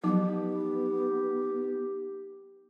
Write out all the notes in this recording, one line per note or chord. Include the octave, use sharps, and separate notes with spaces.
F3 F#3 B3 D#4 G4 D6